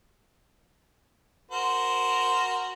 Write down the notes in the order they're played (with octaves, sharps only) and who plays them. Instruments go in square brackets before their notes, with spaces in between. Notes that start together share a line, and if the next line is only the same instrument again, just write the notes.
[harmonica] F#4 A#4 C5